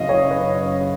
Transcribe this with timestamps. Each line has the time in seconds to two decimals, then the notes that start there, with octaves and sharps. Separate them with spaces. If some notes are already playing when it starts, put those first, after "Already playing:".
Already playing: F#1 F#2 C#3 D#5 F5
0.09 C#5
0.31 B4